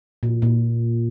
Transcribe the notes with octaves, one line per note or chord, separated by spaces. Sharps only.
A#2
A#2